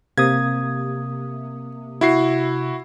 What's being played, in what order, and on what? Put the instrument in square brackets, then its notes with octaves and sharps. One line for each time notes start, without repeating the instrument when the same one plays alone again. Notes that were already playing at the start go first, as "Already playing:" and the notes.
[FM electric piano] C3 [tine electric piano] A#3 D#6 [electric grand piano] G#6
[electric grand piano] E4 F#4 C7